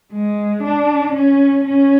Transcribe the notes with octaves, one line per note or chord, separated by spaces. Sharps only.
G#3
D4
C#4
C#4